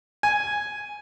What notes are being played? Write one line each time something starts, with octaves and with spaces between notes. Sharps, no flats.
G#5